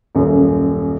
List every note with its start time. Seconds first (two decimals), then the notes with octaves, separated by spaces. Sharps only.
0.15 D#1 F#2